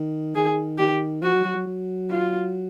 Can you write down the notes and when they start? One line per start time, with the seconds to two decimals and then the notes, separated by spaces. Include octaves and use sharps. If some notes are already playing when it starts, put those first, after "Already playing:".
Already playing: D#3
0.35 D#3 G#4
0.79 D#3 G4
1.22 F3 F#4
1.33 F#3
1.44 F#3
1.55 F#3
1.66 F#3
2.10 F4